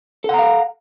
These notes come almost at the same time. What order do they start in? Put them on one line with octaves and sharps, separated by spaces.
A4 F#5 A#5 F5